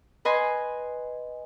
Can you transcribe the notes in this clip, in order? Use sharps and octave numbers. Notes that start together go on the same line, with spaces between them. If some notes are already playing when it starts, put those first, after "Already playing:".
B4 D#5 G#5 B5 C6